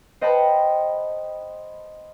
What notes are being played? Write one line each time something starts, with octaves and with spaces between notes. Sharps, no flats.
C5 D#5 F#5 G5 A5 B5